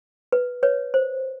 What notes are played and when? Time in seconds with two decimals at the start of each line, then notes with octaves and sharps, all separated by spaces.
0.32 B4
0.63 B4 C#5
0.94 C5